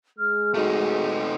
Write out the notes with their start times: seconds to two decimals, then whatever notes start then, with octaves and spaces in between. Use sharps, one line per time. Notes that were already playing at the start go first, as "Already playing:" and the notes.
0.19 G#3 F6
0.54 A3 D#4 F#4